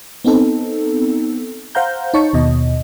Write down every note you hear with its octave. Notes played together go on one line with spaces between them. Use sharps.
B3 C4 D#4 A4
C5 F5 F#5 A#5 G6
D#4 C#5 A5 C#6
D#2 B2 D#5